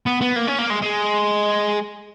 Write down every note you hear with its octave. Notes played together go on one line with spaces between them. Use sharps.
B3
B3
A#3
C#4
A#3
G#3
G#3